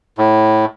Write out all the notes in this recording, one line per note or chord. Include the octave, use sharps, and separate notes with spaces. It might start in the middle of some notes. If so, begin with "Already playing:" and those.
A2